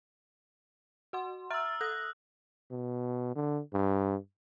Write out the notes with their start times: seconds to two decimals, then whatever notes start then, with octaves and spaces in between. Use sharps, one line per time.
1.13 F#4 F#5 C6
1.50 E5 A#5 E6 F6 A6
1.81 A4 D#6 F#6 A#6
2.71 B2
3.36 D3
3.73 G2